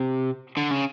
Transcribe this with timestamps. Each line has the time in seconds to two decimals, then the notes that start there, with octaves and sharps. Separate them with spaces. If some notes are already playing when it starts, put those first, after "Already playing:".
Already playing: C3
0.57 D3
0.71 C#3